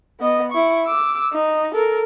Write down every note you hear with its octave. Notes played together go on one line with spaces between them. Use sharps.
B3 D#5
E4 C#6
D6 E6
D#4
A4 A#4